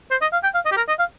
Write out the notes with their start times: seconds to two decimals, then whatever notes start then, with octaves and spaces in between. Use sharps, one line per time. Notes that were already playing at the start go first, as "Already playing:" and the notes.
0.11 C5
0.21 D#5
0.33 F5
0.43 G5
0.54 F5
0.66 D#5
0.72 G4
0.77 A#4
0.88 D#5
0.99 F5